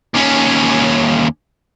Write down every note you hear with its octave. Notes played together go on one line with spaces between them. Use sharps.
D#2 C#4